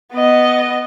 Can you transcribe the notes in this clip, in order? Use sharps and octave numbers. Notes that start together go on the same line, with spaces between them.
B3 D#5